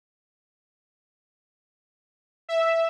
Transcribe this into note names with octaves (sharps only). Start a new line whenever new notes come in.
E5